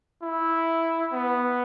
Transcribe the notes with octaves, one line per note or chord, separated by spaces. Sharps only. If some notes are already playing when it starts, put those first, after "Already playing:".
E4
B3